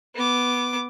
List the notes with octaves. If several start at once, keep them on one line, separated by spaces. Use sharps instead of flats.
B3 D6